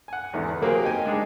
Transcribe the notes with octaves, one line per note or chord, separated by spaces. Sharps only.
F#5 G#5
G#1 E2 D3 E3
B4
F#3 A#3 C4 G4 G#4
D#4 G4 D#5 G5 G#5
G#3 D4 D#4 G#4